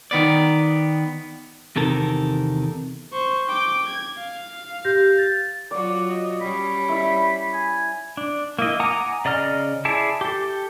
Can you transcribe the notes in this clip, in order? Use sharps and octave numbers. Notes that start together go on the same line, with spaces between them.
D#3 B3 D5
E2 C3 D#3 A4 A#4
C5 C#6
G5 D6
G#6
F5
G4 G6 A#6
A6
F#3 F4 F#4 D5 D6
D#5
G3 C#4 B5
E4 E5
G#5
D4
A#3 E4 D#5
F#5 G#5 A#5 D6 D#6
C#3 D5 D#5 A#5 F6
E4 G#4 D5 A5
G4 A4